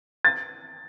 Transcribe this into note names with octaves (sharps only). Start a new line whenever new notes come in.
A6